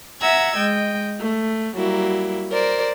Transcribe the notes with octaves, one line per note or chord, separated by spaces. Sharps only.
E5 F#5 A#5 E6 G#6
G#3 D#5 G5
A3
F#3 G3 A#3 E4
A#4 C5 D5